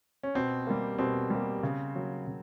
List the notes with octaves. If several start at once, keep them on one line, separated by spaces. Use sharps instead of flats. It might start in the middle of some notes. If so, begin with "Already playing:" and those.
C#4
B2 C4
G3 A#3
B2 C4
G3 A#3
C#3
F#3 A#3
C#3